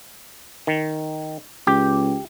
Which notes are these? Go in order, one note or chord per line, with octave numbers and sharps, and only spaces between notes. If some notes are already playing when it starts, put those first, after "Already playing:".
D#3
C#2 G4